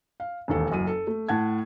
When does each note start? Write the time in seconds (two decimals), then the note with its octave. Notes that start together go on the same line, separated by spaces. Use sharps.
0.20 F5
0.48 E1 D#2 A4
0.71 F#1 F#2 D#7
0.87 A4
1.07 A3
1.29 A2 F#5 A5 G#6